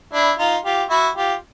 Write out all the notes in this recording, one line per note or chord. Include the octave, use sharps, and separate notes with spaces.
D4 E4
D#4 F4
F4 G4
E4 F#4
F4 G4